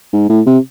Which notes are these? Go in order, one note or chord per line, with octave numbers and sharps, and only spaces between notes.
G#2
A2
C3